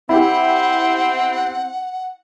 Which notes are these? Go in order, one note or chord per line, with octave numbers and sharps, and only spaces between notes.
C4 E4 G4 F#5